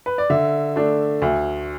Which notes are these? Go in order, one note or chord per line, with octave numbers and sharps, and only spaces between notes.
B4
D5
D3 E5
A3 D4
D2